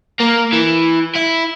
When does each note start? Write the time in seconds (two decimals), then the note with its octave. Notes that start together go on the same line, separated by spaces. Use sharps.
0.20 A#3
0.52 E3
1.15 E4